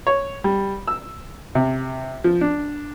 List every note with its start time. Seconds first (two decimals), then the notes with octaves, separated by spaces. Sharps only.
0.07 C#5
0.44 G3
0.88 E6
1.55 C3
2.24 F3
2.41 D4